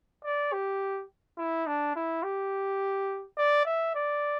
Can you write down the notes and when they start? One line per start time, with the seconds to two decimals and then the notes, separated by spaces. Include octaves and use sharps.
0.25 D5
0.52 G4
1.38 E4
1.67 D4
1.96 E4
2.23 G4
3.38 D5
3.65 E5
3.95 D5